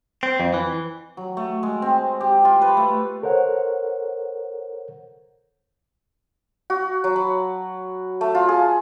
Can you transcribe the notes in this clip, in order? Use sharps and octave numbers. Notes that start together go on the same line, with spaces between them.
C4
F2
E3
F#3
A3
G#3
C4
G4
F4
B4
A3
A4 A#4 C5 C#5 F#5
F#4
F#3
B5
A3
F4
G#4